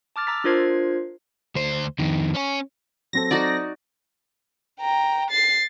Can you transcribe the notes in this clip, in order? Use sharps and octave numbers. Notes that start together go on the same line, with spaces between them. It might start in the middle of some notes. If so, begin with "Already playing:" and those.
A5 D6 F6 A6
A#5 E6 A6 B6
D4 F4 A#4 C5 G#6 C7
D2 C5
F2 D#3
C#4 C#5
F#3 C4 A4 A#6
D#4 F#4 D5
G5 A#5
A6 C7